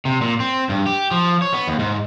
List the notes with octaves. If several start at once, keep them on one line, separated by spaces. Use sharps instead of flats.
C3
A#2
C4
G2
G4
F3
C#5
B3
D#2
G#2